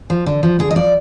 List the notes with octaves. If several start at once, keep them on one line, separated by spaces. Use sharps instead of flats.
F3
D3
F3
D3 G#4
D#5
F3 D5